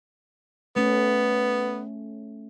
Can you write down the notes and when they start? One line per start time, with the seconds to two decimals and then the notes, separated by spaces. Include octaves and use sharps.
0.76 A3 B3 C#4